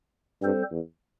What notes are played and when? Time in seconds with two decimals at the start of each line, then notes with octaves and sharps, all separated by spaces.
0.42 G2 G3 C4 A4 C5
0.71 E2